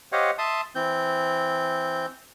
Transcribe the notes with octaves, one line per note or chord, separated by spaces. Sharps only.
G4 C5 C#5 D#5 F5 F#5
E5 A5 C6 D#6
E3 C4 G6